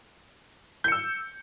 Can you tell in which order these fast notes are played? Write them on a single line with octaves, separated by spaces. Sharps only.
G6 C#7 E6